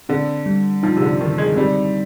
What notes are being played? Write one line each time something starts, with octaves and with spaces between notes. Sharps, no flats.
D3 C4
G3
F3 D#4
C3
D3
D3 D#3
G#3
G3 C4